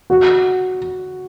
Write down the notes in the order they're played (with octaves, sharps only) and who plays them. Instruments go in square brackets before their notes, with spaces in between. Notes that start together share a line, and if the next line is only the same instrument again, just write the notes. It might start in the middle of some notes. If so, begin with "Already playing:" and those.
[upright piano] F#4